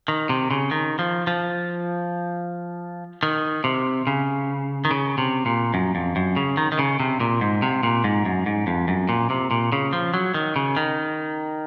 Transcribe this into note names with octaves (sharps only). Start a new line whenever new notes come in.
D#3
C3
C#3
D#3
F3
F3
D#3
C3
C#3
D#3
C#3
C3
A#2
F#2
F2
F#2
C#3
D#3
D#3
C#3
C3
A#2
G#2
C3
A#2
G#2
F#2
G#2
F2
F#2
A#2
C3
A#2
C#3
F3
F#3
D#3
C#3
D#3